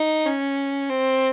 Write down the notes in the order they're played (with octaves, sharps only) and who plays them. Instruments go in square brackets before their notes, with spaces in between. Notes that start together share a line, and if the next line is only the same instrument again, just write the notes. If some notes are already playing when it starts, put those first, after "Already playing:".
Already playing: [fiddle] D#4
C#4
C4